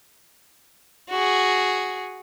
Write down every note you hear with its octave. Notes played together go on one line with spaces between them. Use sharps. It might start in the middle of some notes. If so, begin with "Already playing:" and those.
F#4 G#4